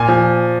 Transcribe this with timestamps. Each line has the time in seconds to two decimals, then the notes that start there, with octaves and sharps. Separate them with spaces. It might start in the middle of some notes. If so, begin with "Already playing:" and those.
Already playing: A#2 G#5
0.08 F3